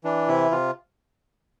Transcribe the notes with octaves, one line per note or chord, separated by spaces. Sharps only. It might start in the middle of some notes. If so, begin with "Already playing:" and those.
E3 D4
C3 E4
C3 F4